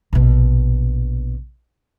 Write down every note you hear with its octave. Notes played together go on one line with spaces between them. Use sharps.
A#1 B2